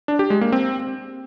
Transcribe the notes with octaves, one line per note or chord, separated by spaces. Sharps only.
D4
G4
G#3
A#3
C4